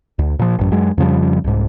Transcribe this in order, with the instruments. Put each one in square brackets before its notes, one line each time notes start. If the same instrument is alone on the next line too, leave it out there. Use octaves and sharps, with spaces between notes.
[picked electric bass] D2
A#2 F3
A1 F#2
F#2 F#3 G#3
F2 C#3 F3 G3
C2 G#2